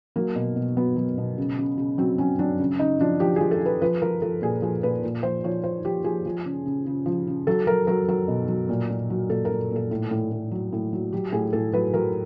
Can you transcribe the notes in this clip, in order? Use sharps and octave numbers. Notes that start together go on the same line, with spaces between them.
F#3 A#3
B2
B2
F#3 B3
F#3
B2
C#3
C#3
C#3
F#3 C4
F#3 C#4
F#3 D4
C#3
C#3 D#4
F3 D4
F3 G4
F3 G#4
A4
F3
B4
F3 B4
F3 A#4
F3 A4
A#2 G#4
F3 G#4
A#2 B4
A#2
F3 C5
F3 C#5
F3 C5
F3 G4
F3 G#4
F3
C#3
C#3
C#3
F3
C#3
F#3 A4
F#3 A#4
F#3 A#4
F#3 A#4
B2
F#3
A#2
A#2
F#3
A#2 A4
A#4
A#2
A#2 A4
A2
A2
A2
F#3
A2
F#3
F#3 G4
A2 G#4
A2 A4
F#3 B4
F#3 A#4